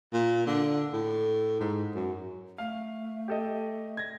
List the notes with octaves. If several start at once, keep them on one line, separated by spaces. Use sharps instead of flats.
A#2
D3
A2
G#2
F#2
A3 F5
G4 A4 D#5
G#6 A#6